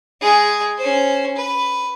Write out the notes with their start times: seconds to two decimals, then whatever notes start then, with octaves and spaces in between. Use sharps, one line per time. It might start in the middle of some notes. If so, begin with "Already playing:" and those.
0.21 G#3 G#4
0.78 C#4 C5
1.36 B4